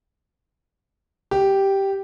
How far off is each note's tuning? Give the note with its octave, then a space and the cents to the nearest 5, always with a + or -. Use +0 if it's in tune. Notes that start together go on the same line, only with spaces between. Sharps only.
G4 -5